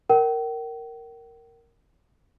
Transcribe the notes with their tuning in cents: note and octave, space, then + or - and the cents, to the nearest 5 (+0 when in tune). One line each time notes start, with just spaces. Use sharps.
A#4 -10 G5 -40